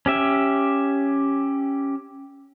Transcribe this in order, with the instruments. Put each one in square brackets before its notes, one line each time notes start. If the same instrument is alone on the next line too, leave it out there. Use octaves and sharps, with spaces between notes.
[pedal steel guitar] C#4 G4 E5